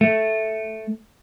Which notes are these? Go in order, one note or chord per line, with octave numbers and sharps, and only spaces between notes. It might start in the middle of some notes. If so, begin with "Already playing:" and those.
A3